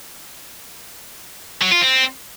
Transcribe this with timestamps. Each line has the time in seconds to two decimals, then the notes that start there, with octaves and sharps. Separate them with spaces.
1.62 F#3
1.71 F4
1.81 C4